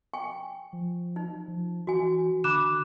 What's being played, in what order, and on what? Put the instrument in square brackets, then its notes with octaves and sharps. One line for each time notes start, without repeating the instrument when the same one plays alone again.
[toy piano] G5 G#5 C#6
[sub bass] F3
[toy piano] D#4
[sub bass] F3
[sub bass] E3 [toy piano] F#4 G#5
[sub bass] D3 [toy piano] D4 B5 [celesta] D6 F#6 E7